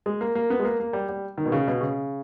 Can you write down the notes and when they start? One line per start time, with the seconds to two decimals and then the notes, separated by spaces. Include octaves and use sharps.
0.06 G#3
0.21 A#3
0.35 A#3
0.50 B3
0.59 G#3
0.65 A#3
0.80 A#3
0.93 G3
1.09 G3
1.38 D#3
1.45 B2
1.52 C#3
1.67 B2
1.81 C#3